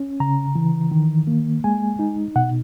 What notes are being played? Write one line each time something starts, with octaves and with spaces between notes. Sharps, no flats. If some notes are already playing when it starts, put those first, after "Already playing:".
Already playing: C#4
C#3 A#5
E3
D#3
A#3
G#3 G#5
D#4
B2 F#5